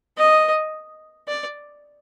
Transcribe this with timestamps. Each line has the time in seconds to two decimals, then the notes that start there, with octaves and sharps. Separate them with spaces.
0.17 D#5
1.28 D5